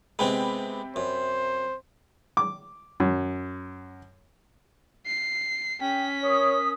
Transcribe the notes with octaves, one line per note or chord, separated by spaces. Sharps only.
C3 G#3 B3 C4 G5 B5
F#2 C5
D6
F#2
C7
C#4 G#4 G5 B6
A#4 C#5 D#6